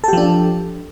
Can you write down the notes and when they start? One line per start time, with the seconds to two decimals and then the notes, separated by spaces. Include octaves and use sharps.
0.04 A4
0.08 G4
0.13 F3
0.17 D4